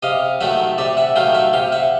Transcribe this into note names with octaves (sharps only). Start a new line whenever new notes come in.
C3 D#5 F5
D#3 F#3 A3 E5 F#5
C3 D5 E5
E5 F#5
D#3 F#3 A3 F5 G5
E5 F#5
C3 F5 G5
E5 F#5